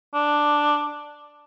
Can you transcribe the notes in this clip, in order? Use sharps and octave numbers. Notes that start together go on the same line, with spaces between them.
D4